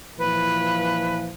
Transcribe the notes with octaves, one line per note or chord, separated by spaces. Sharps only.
A#2 E3 F3 B4